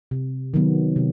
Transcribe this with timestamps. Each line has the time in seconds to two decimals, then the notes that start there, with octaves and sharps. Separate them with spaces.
0.11 C3
0.54 D#3 F#3 B3
0.96 C3